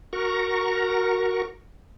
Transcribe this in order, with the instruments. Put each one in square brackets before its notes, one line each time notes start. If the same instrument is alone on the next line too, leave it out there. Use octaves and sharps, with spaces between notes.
[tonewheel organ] F#4 A#4 A#5 C#6